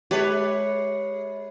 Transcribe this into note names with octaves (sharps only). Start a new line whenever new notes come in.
G#3 G4 B4 C#5